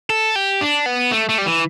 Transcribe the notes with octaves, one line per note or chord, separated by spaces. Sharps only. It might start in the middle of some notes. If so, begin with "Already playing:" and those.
A4
G4
D4
B3
A3
A3
G3
E3